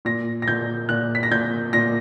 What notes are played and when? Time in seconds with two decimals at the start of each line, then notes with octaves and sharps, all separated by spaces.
0.05 A#2 A#6
0.42 A#6
0.48 A#2 G6
0.89 A#2 F#6
1.15 B6
1.23 A#6
1.31 A#2 G6
1.73 A#2 A#6